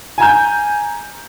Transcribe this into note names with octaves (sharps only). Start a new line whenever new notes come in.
G#5 A#5 G6